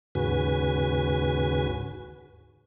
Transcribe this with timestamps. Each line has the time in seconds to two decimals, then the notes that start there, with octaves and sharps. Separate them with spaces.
0.15 D#2 G#2 C#3 F#4 B4 G#5